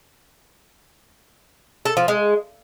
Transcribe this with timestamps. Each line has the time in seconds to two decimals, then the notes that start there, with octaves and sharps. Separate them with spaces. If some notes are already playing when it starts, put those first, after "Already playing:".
1.85 A4
1.97 F3
2.08 G#3